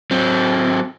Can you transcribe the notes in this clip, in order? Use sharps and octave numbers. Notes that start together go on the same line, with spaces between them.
F#3 C4